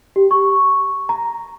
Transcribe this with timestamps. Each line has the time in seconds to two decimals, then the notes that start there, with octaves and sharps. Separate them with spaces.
0.16 G4
0.31 C#6
1.09 A#5